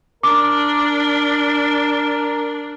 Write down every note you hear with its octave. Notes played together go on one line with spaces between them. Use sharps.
D4 A#4 D6